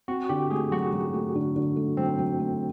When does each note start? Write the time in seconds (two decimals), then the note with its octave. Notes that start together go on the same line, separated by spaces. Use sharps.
0.08 C4 F#4
0.29 D3 G4
0.50 A3 G#4
0.71 F#3 F#4
0.93 F#3
1.14 A3
1.35 D3
1.56 D3
1.76 A3
1.97 F#3 C4
2.19 F#3
2.40 A3